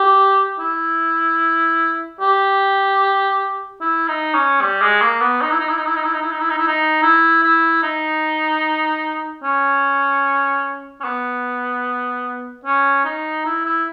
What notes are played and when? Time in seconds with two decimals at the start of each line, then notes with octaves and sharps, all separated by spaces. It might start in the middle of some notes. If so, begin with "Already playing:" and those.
Already playing: G4
0.59 E4
2.21 G4
3.81 E4
4.08 D#4
4.34 C#4
4.61 G3
4.81 G#3
5.01 A#3
5.21 B3
5.42 D#4
5.51 E4
5.59 D#4
5.69 E4
5.78 D#4
5.87 E4
5.96 D#4
6.04 E4
6.13 D#4
6.22 E4
6.31 D#4
6.40 E4
6.50 D#4
6.58 E4
6.67 D#4
7.03 E4
7.43 E4
7.83 D#4
9.44 C#4
11.01 C#4
11.04 B3
12.65 C#4
13.05 D#4
13.46 E4
13.66 E4